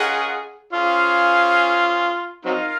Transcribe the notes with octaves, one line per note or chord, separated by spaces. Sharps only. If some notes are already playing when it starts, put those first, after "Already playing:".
Already playing: C#4 F4 G#4 A#4 D#5 F#5
C#4 F4 G#4 C5 F5
F#3 C4 D#4 F4 A#4 F5